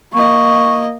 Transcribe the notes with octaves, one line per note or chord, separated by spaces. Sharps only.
A#3 D#5 C#6